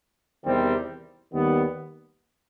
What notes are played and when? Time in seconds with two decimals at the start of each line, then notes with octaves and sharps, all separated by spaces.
0.46 E2 C3 D#3 G3 C4
1.33 D#2 D#3 G3 B3